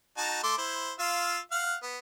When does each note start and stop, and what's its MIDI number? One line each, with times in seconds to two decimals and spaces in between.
0.17 0.39 63
0.17 0.39 66
0.17 0.39 81
0.43 0.56 57
0.43 0.56 84
0.43 0.56 86
0.58 0.92 64
0.58 0.92 72
0.99 1.40 65
0.99 1.40 77
0.99 1.40 88
1.52 1.75 77
1.52 1.75 78
1.52 1.75 89
1.83 1.98 59